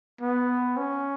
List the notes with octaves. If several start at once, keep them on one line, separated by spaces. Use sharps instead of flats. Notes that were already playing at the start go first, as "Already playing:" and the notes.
B3
C#4